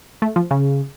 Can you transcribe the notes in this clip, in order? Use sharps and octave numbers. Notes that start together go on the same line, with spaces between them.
A3
F3
C#3